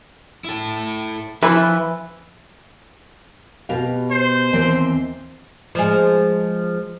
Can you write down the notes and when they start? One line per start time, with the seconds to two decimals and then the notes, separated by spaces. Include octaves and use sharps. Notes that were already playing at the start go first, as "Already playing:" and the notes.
0.44 E4 A4
1.43 E3 F3 B4
3.69 B2 G4 F5
4.11 C5
4.53 D#2 E3 C4
5.75 F3 G#3